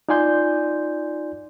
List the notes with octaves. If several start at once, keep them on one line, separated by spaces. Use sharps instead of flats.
D#4 F4 D5 G#5 C6 G6